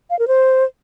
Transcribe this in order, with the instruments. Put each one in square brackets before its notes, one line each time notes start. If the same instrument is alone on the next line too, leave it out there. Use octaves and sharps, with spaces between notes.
[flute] F5
A#4
C5